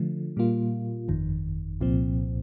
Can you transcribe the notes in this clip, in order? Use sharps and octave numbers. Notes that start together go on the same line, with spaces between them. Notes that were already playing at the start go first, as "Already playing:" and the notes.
Already playing: D3 F3 A3
A#2 G3 A#3 F4
G1 F2 D#3
C2 A#2 F3 C4